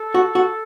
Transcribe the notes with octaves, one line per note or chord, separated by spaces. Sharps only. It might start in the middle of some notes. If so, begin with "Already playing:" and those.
Already playing: A4
F#4
F#4